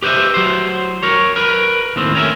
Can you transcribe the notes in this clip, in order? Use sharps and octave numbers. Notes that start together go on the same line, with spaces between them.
G4 B4 C5 D#5 E5
F#3 C5
A#4 C#5
A#4 B4
D#2 A2 C4
C#4 A#4 E5